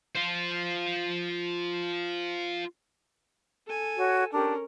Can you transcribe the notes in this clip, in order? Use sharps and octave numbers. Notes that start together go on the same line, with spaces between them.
F4 C5
A4 G#5
F#4 C#5
C#4 D4 G4 A#4